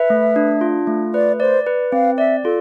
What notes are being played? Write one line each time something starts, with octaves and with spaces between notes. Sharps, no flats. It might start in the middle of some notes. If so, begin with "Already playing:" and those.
Already playing: B4 E5
A3
D4
F4
A3
B4 D5
C5 D5
B4
C4 F5
D5 E5
F4 A4